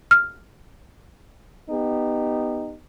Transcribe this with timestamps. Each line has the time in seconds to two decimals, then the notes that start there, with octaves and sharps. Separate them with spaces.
0.11 F6
1.70 B3 D#4 G4